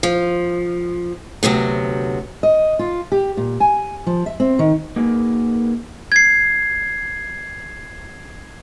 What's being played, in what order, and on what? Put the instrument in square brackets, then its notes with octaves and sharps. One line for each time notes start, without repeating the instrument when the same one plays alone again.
[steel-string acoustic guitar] F3
D2 C3 F#3 B3
D#5
F4
G4
A#2
G#5
F3
E5
C4
D#3
[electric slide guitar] A#3 D#4 F#4 G#4 A#4 B4
[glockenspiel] G#6 C7